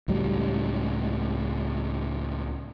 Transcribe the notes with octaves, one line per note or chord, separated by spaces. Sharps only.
C#2 A2 F#3 G3